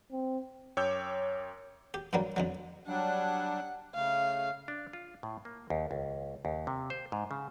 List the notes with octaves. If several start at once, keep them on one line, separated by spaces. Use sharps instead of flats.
C4
F#2 C#5 G5 D6 E6 G6
G4
G2 F#3 G3 A#3
F2 D3 F#3
F#3 G3 D4 F#5
C#3 A3 F5
D4
F4
A2
A#3
D#2
C#2
D#2
C3
C5
G#2
C#3